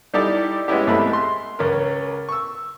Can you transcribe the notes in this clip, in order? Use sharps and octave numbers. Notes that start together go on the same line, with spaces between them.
G3 D#4 E4 G4 A4 D5
G#3 B3 C#4 E4 G4
C2 G#3 A3 E5 B5
C6
C#2 C#4 A#4
C#6 E6